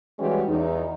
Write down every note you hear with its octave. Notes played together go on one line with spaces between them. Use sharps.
E3 G3 G#3 C#4 F#4 G4
E2 D#4